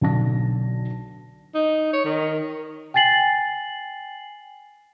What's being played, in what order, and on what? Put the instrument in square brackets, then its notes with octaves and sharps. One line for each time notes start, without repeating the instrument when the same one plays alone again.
[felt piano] B1 D3 A5 A#6
[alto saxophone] D#4
C#5
D#3
[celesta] G5 G#5 A6 C7 F#7